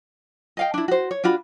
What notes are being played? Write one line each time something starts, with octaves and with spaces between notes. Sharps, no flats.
D#5 F5 G5
D4 E4
F#4 C5
C#5
D4 F4 F#4 B5